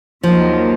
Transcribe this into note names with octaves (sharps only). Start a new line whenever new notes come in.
D#2 D#3 F3 F#3 A#3